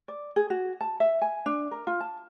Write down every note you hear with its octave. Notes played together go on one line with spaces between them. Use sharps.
D5
G#4
F#4
A5
E5
G#5
D4
A#4
F4
A5